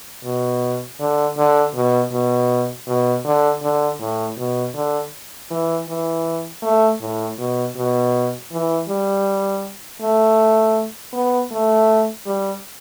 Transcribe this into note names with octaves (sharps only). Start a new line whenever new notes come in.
B2
D3
D3
B2
B2
B2
D3
D3
A2
B2
D3
E3
E3
A3
A2
B2
B2
E3
G3
A3
B3
A3
G3